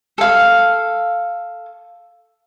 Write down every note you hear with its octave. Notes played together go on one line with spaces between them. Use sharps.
A4 F5